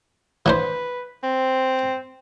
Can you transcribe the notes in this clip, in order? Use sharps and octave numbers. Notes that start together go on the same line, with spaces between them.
E3 D4 B4 C5
C4